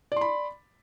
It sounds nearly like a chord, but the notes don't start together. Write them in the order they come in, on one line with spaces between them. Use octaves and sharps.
D5 C6 B5